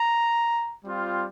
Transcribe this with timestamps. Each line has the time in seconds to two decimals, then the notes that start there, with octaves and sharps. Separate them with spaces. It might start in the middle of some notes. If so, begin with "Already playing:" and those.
Already playing: A#5
0.85 G3 C4 F4